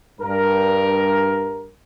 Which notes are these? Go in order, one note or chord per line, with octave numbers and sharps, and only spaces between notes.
G2 A#4